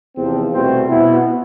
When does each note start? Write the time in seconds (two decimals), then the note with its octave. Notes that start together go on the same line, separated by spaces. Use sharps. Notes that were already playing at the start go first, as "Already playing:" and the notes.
0.17 E2 C3 F3 C4
0.53 C2 B2 A3 C4
0.89 B2 B3 E4